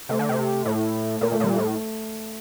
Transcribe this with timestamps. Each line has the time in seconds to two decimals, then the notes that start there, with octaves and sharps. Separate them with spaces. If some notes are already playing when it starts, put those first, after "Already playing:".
0.09 C3 A3
0.19 D3
0.29 C3
0.65 A2 A3
1.21 A#2 A#3
1.32 A3
1.40 A#2 G3
1.54 A2 A3